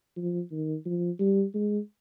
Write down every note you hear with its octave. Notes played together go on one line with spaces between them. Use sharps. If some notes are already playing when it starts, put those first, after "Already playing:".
F3
D#3
F3
G3
G#3